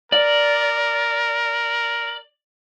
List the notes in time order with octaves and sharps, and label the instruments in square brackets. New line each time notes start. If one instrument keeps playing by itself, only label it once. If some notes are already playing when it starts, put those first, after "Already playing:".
[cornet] A#4 [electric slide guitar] D5